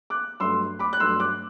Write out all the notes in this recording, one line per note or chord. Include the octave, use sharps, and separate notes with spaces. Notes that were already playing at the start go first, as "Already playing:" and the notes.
D6 F#6
G2 F#3 A3 C6 E6
B5 D6
F#6
G2 F#3 A3 C6 E6
D6 F#6